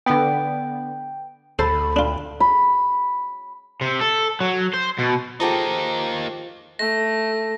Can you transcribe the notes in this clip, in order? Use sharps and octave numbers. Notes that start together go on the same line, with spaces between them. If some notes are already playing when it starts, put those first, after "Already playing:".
D3 B3 G5
D2 A4 C5 B5
D4 F4
B5
C3
A4
F#3
C5
B2
F3 G#3 A#3 D#4 G4 A4 A#5 D6
A3 A#6